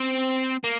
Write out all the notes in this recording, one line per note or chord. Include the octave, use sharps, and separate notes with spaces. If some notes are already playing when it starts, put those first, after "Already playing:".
Already playing: C4
A#3